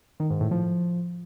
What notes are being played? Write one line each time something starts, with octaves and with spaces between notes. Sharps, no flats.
D#3
G#2
A2
F3